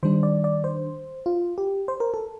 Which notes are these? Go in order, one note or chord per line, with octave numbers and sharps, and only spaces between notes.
D#3 G3 D4 C5
D5
D5
C5
F4
G4
C5
A#4
A4